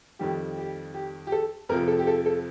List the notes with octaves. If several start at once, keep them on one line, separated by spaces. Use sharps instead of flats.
F2 D#3 G3 G4
G4
G4
G4
A4
F2 C3 F3 A#4
A4
G4
A4
A4